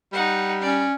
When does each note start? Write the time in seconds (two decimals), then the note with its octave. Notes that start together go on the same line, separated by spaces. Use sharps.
0.13 G3 D#4 F#5
0.62 C#4 D5